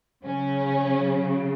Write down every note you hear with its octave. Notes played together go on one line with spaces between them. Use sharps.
C#3 F#3 C#4